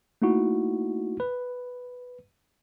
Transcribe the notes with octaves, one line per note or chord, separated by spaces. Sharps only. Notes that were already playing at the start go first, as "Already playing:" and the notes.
A3 A#3 D#4 E4 F#4
B4